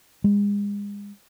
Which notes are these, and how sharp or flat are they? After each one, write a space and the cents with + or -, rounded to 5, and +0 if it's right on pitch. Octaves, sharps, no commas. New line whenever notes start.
G#3 -35